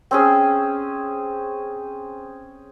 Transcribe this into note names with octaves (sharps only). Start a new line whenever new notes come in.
C4 C#4 G#4